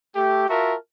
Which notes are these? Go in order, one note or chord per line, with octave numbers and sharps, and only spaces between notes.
A3 G4
F4 F#4 A#4 E5 A5